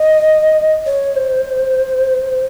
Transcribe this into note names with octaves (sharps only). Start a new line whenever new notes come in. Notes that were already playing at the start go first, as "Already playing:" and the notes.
Already playing: D#5
C#5
C5